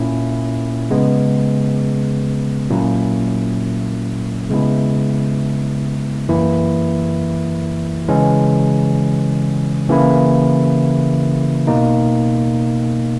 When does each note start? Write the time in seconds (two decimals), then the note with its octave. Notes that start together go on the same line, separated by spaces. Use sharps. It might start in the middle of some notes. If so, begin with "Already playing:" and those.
Already playing: A#2 A#3 C#4 E4
0.91 C#3 G#3 B3
2.70 A#2 F#3 A#3 C#4 E4
4.50 C#3 G#3 B3 E4
6.29 F#2 E3 A#3 E4
8.08 C#3 E3 G#3 C#4
9.89 C#3 E3 A#3 E4
11.67 B2 A#3 D#4